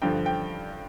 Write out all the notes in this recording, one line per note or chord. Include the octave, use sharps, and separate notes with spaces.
G2 D3 F3 G5
G5